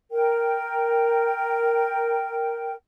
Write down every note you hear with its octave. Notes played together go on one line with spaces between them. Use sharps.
A#4 G5